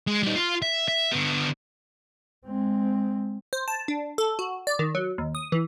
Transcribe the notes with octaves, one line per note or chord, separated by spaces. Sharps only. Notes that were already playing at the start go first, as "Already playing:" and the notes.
G#3
G3 D#4
F4
E5
E5
D3 B3
G#3 C4
C5
A5
D4
A4
F#4
D5
D#3
F#3
D#2
D#6
E3